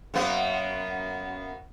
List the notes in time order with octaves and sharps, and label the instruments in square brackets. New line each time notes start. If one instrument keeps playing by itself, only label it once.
[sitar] F#2 A#3 B3